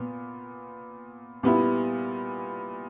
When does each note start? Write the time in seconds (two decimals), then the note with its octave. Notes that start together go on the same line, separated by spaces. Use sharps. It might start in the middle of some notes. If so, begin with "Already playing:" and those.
Already playing: A#2 B3
1.43 A#2 G3 B3 E4